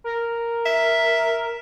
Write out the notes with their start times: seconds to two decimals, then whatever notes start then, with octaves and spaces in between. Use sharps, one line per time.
0.04 A#4
0.66 E5